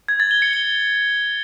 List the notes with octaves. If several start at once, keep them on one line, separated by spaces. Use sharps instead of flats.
G#6
A6
G7
C#7
G7